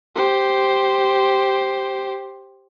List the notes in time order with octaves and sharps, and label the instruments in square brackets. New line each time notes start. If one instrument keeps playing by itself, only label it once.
[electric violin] G4 C5